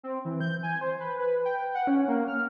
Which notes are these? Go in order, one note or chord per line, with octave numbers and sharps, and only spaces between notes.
C4
E3
G6
G#5
C5
B4
B4
G5
F#5
C#4
A#3
F6